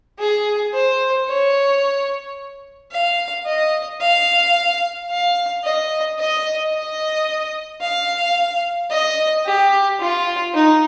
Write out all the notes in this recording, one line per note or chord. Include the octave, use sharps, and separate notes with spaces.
G#4
C5
C#5
F5
D#5
F5
F5
D#5
D#5
D#5
F5
D#5
G4
F4
D#4